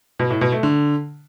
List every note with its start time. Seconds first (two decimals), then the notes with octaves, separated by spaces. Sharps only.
0.19 B2
0.30 A2
0.41 B2
0.52 A3
0.63 D3